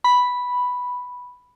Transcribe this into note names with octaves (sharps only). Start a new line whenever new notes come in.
B5